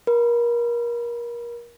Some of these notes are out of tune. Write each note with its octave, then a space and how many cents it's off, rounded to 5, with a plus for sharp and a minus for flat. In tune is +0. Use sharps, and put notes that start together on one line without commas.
A#4 +30 B5 +0